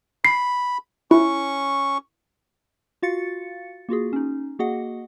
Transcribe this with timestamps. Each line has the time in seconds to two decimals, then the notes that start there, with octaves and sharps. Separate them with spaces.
0.25 B5 C7
1.11 C#4 E4 C#6
3.02 F4 F#4 F5 A6 C#7
3.89 A#3 F4 F#4 G#4
4.13 C#4 D#4
4.59 A#3 F#4 G#4 D#5 F#5